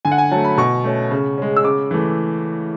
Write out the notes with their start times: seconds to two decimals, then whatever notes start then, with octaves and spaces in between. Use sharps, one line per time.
0.05 D3 G#5
0.11 F#5
0.18 G#5
0.31 F#3 A3 A5
0.44 B5
0.58 B2 C#6
0.84 A3 C#4
1.11 C#3
1.38 G#3 C#4
1.57 E6
1.64 C#3 D6
1.91 E3 A3